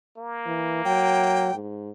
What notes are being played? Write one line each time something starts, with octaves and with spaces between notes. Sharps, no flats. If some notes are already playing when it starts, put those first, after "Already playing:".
A#3
E3
F#3 G5
G#2